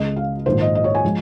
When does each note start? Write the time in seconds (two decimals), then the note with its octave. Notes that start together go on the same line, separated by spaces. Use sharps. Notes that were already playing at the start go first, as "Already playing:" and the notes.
Already playing: C#2 C#3 G#3 D#5
0.16 F5
0.46 A#1 G#2 D#3 G#3 C5
0.61 D#5
0.75 D#5
0.84 C#5
0.95 G#5
1.05 F3 G#3